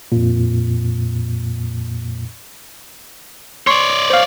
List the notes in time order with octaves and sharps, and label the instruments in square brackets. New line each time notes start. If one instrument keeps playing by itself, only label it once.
[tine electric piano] F2 A#2
[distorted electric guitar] C#5 D5 [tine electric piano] C6 C#6
[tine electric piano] C5 F5